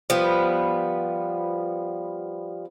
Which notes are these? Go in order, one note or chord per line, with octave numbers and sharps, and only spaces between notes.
F3 G3 B3